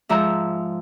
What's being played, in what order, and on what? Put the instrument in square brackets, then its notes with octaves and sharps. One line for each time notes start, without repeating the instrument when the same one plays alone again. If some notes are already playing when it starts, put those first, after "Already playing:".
[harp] G#2 F3 E5 A#5